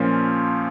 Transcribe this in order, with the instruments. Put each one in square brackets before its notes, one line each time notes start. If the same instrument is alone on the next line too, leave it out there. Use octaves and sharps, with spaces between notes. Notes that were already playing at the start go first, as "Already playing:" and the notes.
Already playing: [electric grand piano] A#2 F3 C#4 F4